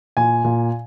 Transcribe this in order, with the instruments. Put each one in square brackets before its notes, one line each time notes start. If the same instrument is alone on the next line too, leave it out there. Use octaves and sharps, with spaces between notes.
[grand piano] A#2 G#5
A#2